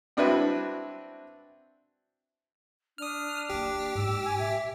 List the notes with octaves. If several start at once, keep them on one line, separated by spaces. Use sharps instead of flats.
C4 D4 E4 F#4 B4
D4 D#6 F6
D#3 A#3 G4
G#2 E6
G#5
A#2 E5